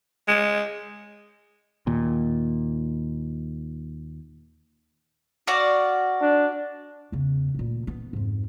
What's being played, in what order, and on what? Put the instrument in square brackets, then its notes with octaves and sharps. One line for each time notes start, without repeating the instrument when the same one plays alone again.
[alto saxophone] G#3
[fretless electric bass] D#2 A#2
[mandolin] F#4 D5 F5
[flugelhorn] D4
[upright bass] E2 C#3
D2 A#2
B3
F2 G#2